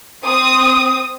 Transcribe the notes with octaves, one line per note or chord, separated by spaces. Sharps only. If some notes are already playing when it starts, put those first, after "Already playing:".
C4 D#6